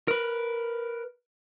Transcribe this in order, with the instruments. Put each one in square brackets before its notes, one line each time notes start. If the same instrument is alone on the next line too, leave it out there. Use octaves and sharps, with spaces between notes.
[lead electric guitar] A#4 B4